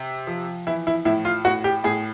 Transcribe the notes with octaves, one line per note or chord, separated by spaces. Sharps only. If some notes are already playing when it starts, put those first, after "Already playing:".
Already playing: C3
F3
E3 E4
E4
A2 E4
F4
A2 F#4
G4
A2 G#4